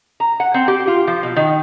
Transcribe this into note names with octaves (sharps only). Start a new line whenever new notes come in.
A#5
F#5
C4
G4
F4
F3
B2
D#3